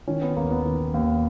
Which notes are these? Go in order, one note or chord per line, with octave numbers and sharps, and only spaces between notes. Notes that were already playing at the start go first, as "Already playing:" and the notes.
D#3 C#4
B3
D#2 A#3
B3
D#3
D#2